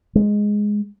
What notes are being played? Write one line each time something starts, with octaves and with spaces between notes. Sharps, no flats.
G#3